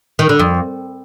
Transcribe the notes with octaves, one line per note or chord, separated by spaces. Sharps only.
D#3
D3
F2